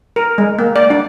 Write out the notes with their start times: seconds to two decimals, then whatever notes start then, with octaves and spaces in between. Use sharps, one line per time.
0.16 A#4
0.38 G#3
0.59 A#3
0.76 D5
0.90 D4